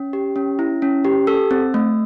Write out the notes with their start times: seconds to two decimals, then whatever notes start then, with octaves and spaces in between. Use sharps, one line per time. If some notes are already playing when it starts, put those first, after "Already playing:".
Already playing: C#4
0.13 G4
0.36 C#4
0.59 E4
0.82 C#4
1.05 G4
1.27 A4 E6
1.51 C4
1.74 A3